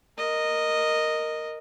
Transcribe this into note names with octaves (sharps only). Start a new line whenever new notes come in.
A#4 D#5